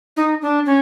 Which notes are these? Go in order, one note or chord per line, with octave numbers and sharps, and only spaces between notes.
D#4
D4
C#4